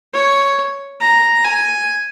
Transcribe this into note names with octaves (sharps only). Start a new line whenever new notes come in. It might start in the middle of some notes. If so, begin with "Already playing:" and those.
C#5
A#5
G#5